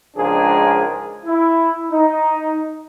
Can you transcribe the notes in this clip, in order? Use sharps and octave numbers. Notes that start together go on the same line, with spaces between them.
C#2 G#2 F3 D4 G#4 A#4
E4
D#4